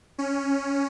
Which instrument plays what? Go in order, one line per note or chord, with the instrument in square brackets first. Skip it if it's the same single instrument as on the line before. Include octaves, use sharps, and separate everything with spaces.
[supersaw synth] C#4